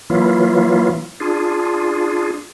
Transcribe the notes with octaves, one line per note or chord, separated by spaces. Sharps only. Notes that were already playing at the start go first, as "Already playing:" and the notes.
E3 F#3 A#3 E4 F4
D4 F4 G#4